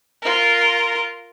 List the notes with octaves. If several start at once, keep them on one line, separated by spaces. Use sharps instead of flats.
F4 A#4